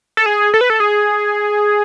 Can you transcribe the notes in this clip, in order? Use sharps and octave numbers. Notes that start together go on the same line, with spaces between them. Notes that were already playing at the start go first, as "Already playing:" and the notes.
A4
G#4
A4
B4
A4
G#4